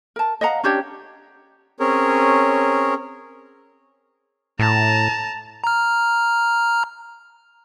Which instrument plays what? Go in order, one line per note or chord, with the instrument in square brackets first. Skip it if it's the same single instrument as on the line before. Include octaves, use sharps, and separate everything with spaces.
[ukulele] A#4 A5
D#5 F5 F#5 A#5
C#4 D4 G4 C#5
[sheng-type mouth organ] C4 C#4 G#4 A#4 C#5
[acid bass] A2 [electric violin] A5 A#5
[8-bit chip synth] A#5 F6